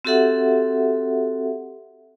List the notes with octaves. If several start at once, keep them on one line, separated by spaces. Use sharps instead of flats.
C4 F#4 G4 A4 E5 F#5